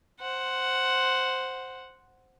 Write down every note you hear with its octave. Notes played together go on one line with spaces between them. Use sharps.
C5 F#5